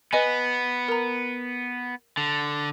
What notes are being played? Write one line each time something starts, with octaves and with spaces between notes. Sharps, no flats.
B3 B4 D#5 G#5
A#4 A#5
D3